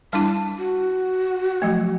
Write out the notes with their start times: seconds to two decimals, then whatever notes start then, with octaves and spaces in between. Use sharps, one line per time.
0.13 G3 D4 E4 A5
0.58 F#4
1.62 F3 F#3 A3